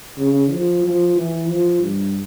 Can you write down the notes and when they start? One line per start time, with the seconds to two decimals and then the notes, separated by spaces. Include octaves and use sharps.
0.18 C#3
0.51 F3
0.84 F3
1.16 E3
1.48 F3
1.81 G2